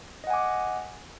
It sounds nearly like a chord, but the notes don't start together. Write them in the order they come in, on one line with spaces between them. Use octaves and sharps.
D#5 F#5 G#5 D6